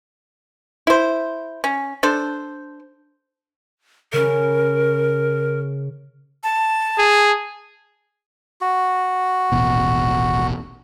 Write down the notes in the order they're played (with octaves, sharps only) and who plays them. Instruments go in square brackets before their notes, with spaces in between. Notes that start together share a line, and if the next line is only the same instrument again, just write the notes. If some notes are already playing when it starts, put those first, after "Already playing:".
[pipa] E4 C5
C#4
D4 A4 C5
[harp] C#3 C#4 [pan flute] A#4
[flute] A5
[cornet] G#4
[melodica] F#4
[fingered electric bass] D#1 A1 B2